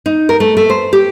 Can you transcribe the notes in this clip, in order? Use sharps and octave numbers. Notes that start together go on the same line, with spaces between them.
D#4
A#4
A3
A3
C5
G4